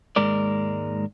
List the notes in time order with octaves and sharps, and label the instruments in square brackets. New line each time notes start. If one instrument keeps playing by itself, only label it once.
[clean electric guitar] D#2 G#2 G#3 A#4 D5